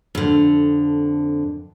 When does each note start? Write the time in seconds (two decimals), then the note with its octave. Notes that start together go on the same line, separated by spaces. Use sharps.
0.15 F2 D3